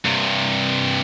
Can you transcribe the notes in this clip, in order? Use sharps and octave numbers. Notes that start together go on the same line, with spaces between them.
G2 C3